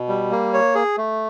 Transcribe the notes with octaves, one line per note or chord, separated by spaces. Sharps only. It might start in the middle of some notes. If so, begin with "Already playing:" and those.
Already playing: B2
G3
A#3
C#5
G#4
A3